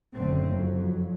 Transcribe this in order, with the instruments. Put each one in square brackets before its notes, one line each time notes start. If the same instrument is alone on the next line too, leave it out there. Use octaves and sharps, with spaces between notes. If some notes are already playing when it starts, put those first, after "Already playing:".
[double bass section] F#1 D3 A3 C4
F2 F#3